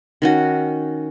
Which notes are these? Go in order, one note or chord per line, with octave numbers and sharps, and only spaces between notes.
D#3 C#4 F#4